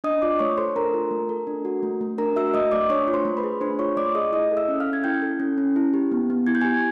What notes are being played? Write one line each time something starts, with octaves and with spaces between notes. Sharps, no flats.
D4 D#5 D#6
F4 D5 D6
A3 C#5 C#6
A4 C5 C6
D4 A#4 A#5
F4
A3
A4
D4
F#4
A3
A3
D4 A#4 A#5
F#4 E5 E6
A3 D#5 D#6
A3 D5 D6
D4 C#5 C#6
F4
C5 C6
A3
B4 B5
G#4
D4 C5 C6
F4 C#5 C#6
A3 D5 D6
G#4 D#5 D#6
E4 D#5 D#6
A4
E5 E6
C#4
F5 F6
C#4
G#6
E4 G5 G6
A4
C#4
C#4
E4
G4
B3
B3
E4 G#6
G6
G4 G#5 G#6